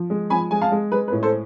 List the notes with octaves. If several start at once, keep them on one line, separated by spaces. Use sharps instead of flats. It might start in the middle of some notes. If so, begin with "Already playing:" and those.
Already playing: F3
G#3
F3 G#5 B5
G#3 G#5
F5 A5
G#3
G#3 B4
B4
A2
A4 C5